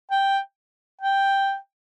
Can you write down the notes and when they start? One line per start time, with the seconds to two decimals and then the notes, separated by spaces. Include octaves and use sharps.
0.11 G5
1.01 G5